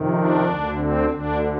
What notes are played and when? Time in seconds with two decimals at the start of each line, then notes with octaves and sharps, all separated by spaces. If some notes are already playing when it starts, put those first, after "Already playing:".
Already playing: F2 C3 D#3
0.12 D4
0.44 D2 D3
0.76 C4
1.10 D2 D3 D4